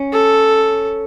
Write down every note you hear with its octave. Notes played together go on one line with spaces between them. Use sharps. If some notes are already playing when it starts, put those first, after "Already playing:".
Already playing: C#4
A4